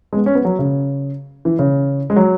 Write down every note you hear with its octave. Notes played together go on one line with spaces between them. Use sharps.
G#3
B3
C#4
B3
F#3
C#3
E3
C#3
G#3
F#3